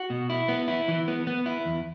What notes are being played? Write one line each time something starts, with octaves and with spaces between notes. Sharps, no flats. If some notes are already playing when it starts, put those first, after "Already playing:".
Already playing: F#4
B2
E4
B3
E4
E3
B3
B3
E4
E2